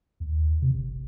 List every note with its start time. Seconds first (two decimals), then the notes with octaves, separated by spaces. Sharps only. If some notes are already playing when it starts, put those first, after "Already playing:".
0.20 D#2
0.62 C3
0.75 G1
0.92 D1